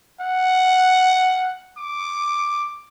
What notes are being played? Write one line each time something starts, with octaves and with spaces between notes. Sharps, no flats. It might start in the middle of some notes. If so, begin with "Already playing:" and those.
F#5
D6